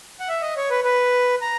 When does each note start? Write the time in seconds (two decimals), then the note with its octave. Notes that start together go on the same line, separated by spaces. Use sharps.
0.20 F#5
0.29 E5
0.42 D#5
0.57 C#5
0.70 B4
0.84 B4
1.42 A#5